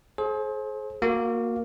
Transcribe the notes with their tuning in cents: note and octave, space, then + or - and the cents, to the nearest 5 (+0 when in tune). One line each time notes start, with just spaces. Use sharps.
G#4 +40 C5 +30
A#3 +0 F#4 -20